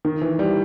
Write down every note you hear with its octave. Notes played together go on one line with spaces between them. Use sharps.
D#3
E3
G3